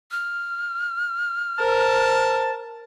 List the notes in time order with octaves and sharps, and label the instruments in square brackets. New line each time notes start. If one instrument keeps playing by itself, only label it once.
[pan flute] F6
[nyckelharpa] A#4 [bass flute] C5 [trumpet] A5